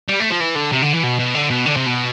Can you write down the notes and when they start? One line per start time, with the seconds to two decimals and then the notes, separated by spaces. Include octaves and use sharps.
0.09 G3
0.20 A3
0.30 F3
0.40 E3
0.55 D3
0.72 C3
0.82 D3
0.93 E3
1.03 B2
1.19 B2
1.35 D3
1.50 B2
1.66 D3
1.76 C3
1.86 B2